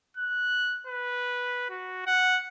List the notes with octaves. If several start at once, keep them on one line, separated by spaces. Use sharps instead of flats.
F#6
B4
F#4
F#5